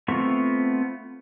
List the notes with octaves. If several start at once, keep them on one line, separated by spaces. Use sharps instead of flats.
A3 B3 C4 F4 C#6